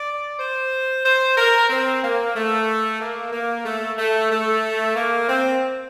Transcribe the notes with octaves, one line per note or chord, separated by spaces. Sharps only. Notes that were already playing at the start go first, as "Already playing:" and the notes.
Already playing: D5
C5
C5
A#4
C4
A#3
A3
A#3
A#3
A3
A3
A3
A#3
C4